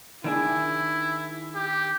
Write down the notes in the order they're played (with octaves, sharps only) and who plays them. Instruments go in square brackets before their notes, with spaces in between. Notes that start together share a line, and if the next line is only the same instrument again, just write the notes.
[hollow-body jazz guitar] D#3 D4 G#4 [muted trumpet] E4
[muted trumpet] G4